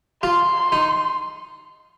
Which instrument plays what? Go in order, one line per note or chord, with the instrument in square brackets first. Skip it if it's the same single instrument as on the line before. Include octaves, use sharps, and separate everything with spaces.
[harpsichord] F4 [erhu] C6
[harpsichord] D#4